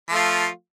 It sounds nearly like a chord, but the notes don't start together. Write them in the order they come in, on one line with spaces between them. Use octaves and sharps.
F3 A3 F4